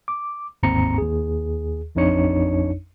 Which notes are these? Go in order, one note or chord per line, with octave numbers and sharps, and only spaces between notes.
D6
G1 D#2 G#2 C4 A#5 C#7
D#2 G#4
A1 F2 D4 D#4 C#5 C#7